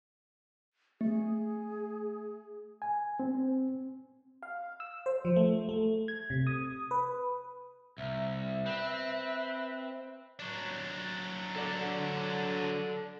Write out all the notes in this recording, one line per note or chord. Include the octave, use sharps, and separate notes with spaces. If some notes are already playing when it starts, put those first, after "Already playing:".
A3 G#4
G#5
C4
F5
E6
C5
F3
A3
A3
G#6
C3
D#6
B4
C2 E5
C4 B4
F#3 D4
A4 D5